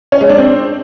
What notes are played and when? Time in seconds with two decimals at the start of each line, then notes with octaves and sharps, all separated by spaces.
0.12 C#4
0.21 G#3
0.29 D4
0.38 C4